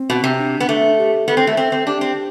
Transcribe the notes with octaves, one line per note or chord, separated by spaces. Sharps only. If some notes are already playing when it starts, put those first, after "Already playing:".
Already playing: C4
B2
C3
D4
B3
A3
G4
B3 A4
C4
A3
C4 A4
C4
D4 G4
C4